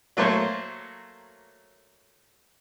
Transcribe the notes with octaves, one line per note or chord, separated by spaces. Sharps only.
F#3 A3 A#3 C5 C#5